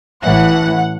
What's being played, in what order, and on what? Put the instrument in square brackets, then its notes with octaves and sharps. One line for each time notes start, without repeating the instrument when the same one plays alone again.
[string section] A1 A2 E3 F#5